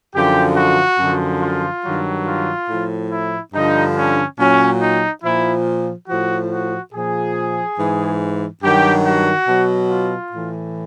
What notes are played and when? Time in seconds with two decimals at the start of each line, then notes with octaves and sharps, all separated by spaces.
0.14 F#2 D3 F3 G4
0.56 F#4
0.99 F#2 D3 F3
1.42 F4
1.84 G2 D#3 F#3
2.26 F4
2.69 A2 F3
3.12 E4
3.54 G2 D3 F3 D#4
3.96 C#4
4.38 A#2 F#3 C#4
4.81 D#4
5.23 A#2 F3 E4
6.08 A2 F3 F#4
6.51 F#4
6.93 A#2 F3 G#4
7.79 G#2 E3
8.63 G2 D#3 F#3 G4
9.06 F#4
9.48 B2 F#3
9.90 F4
10.33 A2 E3